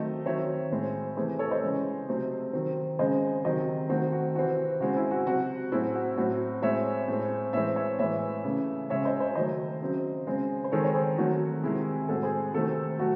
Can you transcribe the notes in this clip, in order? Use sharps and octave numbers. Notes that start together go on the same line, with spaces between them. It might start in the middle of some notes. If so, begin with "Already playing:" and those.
Already playing: D#3 F#3 A3 C4 C5 D#5
D#3 F#3 C4 C#5 E5
A2 G#3 C4
C3 E3 A3 G#4 C5
A4 C#5
C5 D#5
C#3 E3 G#3
C3 F#3 A3 C4
D#3 F#3 C4
C#3 G#3 C4 C5 D#5
C3 D#3 F#3 C5 D#5
D#3 A3 C4 F#4
F#4
C3 E3 C4 F#4
C#3 G#3 C4 F#4
E4
F#4
C3 F#3 C4 F#4
A2 F#3 C4 E4 G#4
F#4
A2 F#3 C4 F#4
A2 G#3 C4 C#5 E5
A2 G#3 C4
A2 E3 G#3 C4 C#5 E5
C#5 E5
A2 E3 G#3 C#5 E5
C#3 E3 A3
C#3 G#3 C4 C#5 E5
C5 D#5
C5 D#5
D#3 F#3 A3 C5 D#5
C#3 F#3 C4
C#3 G#3 C4
C5
D#3 G#3 C4 A4 C#5
C#5
G#4 C5
D#3 F#3 A3 C4 F#4
C3 D#3 G#3 E4 G#4
A2 G#3 C4 F#4 A4
G#4 C5
C3 D#3 A3 C4 F#4 A4
F#3 A3 F#4